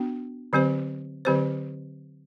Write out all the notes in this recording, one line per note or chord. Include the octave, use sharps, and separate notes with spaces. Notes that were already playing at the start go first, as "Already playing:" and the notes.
Already playing: B3 D4 F#4
D3 F#3 C4 G4 C5
D3 F#3 C4 G4 C5